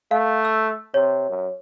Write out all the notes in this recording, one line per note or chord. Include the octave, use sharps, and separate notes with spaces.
A3 F5
E6
C3 C#5
F#2